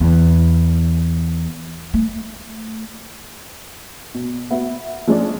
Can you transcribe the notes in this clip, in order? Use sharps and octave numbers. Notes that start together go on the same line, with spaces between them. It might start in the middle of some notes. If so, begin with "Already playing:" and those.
E2
A3
B2
B3 F#4 E5
F3 G#3 C#4 D4 G#4 D5